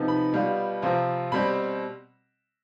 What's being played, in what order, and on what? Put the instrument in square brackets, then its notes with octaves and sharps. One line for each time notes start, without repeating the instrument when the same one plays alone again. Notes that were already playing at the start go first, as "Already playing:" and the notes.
Already playing: [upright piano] C3 F3 B3 D#4
B5
B2 G3 B3 F4
C3 F3 C4 F4
B2 G3 C4 B5